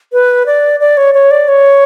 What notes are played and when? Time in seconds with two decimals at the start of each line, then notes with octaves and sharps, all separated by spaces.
0.13 B4
0.46 D5
0.80 D5
0.97 C#5
1.14 C#5
1.31 D5
1.48 C#5